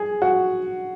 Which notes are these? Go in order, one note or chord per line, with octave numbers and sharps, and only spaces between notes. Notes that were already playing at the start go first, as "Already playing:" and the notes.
Already playing: G#4
F#4